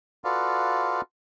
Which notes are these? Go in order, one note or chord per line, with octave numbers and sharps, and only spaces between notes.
F4 F#4 A4 B4 D5 F5